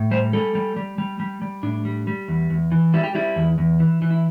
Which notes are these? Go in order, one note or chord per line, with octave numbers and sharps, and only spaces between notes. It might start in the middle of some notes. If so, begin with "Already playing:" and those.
Already playing: A2
G3 C5
G3 A4
G3
G3
G3
G3
G3
A2 D4
G3
G3
E2
E2
E3
G3 E4
G4
G3 E4
E2
E2
E3
E3
E4